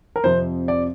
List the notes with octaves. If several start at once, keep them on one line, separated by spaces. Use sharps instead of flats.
A#4
F2 C3 F3 C5
D5